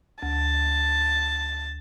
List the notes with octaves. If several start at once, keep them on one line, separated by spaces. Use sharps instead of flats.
D2 A5